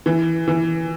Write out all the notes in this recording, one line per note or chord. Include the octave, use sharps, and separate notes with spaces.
E3
E3